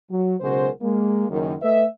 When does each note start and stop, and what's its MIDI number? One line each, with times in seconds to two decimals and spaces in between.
0.11 0.35 54
0.41 0.69 35
0.41 0.69 49
0.41 0.69 56
0.41 0.69 66
0.41 0.69 70
0.41 0.69 72
0.82 1.25 56
0.82 1.25 58
1.29 1.54 30
1.29 1.54 42
1.29 1.54 51
1.62 1.85 57
1.62 1.85 71
1.62 1.85 75
1.62 1.85 76